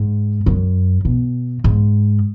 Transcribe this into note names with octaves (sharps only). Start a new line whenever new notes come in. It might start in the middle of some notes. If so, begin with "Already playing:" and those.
Already playing: G#2
F#2
B2
G#2